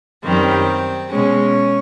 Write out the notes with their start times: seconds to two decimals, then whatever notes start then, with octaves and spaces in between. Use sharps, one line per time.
0.23 F#2 D#3 G3 C4
1.10 B2 G#3 C#4